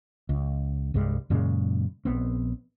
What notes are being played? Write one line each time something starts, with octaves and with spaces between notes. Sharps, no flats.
C#2
C2 G2 G3 G#3
F#2 A#2 C#3 G#3
A#1 B3 C4